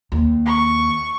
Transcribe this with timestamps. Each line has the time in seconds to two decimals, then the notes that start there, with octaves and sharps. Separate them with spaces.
0.12 D#2
0.46 C#6